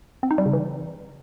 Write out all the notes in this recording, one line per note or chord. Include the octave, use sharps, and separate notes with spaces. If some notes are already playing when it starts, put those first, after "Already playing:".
C4
D#4
G3
C#3
E3